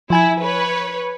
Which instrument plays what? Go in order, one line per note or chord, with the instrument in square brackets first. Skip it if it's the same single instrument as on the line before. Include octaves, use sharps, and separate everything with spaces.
[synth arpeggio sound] F3 G#5 G#6 [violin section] E4
[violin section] B4 C#5